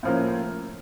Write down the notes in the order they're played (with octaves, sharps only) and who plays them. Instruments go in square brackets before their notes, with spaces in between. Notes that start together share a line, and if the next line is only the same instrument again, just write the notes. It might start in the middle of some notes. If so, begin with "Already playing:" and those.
[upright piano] A2 F3 A#3 C#4